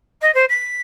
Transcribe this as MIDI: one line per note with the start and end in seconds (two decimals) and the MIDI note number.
0.21 0.33 75
0.34 0.45 72
0.49 0.80 95